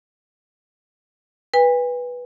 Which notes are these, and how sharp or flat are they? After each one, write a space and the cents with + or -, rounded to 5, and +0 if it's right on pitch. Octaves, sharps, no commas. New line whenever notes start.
B4 -10 G#5 -45